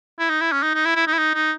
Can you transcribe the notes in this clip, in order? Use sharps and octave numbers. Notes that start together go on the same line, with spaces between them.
E4
D#4
E4
C#4
D#4
D#4
E4
E4
D#4
E4
D#4
D#4